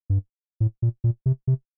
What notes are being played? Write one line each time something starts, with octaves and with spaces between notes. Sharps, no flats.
G2
A2
A#2
A#2
C3
C3